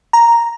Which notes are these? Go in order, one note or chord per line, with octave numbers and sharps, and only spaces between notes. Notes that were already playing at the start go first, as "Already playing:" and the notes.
A#5